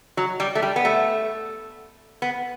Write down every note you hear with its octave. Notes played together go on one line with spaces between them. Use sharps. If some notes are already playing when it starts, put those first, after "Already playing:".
F#3
G3
A3
G3
B3
A3
B3